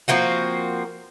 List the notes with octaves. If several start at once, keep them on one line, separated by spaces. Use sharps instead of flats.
F3 A#3 C4 F#4